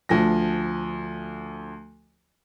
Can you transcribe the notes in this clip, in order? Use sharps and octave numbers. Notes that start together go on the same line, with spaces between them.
D2 F3 A#6